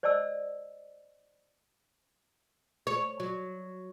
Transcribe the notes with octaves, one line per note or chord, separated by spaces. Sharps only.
C5 D5 D#5 A5 E6
C#5
F#3